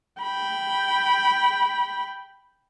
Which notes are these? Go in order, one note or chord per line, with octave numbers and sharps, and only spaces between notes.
G5 B5